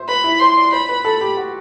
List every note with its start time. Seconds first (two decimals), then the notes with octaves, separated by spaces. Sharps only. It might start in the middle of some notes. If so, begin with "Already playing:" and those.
Already playing: C5 E5
0.08 B4 B5
0.24 E4
0.40 C5 C6
0.57 D5
0.72 C5 B5
0.89 B4
1.05 A4
1.21 G4
1.37 F#4